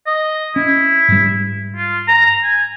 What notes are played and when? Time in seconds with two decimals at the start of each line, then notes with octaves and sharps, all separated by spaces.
0.07 D#5
0.56 C#4 E4
1.08 G#2 G3
1.76 F4
2.08 A#5
2.43 G#5